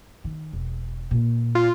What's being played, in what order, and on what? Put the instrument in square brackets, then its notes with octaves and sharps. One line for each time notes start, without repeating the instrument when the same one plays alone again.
[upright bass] D#3
E1
A#2
[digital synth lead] F4